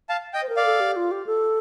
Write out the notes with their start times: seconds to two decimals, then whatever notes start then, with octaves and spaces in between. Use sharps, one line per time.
0.09 F5 A5
0.34 D#5 G5
0.42 C5
0.49 A#4
0.57 D5 F5
0.65 A4
0.80 G4
0.96 F4
1.11 G4
1.27 A4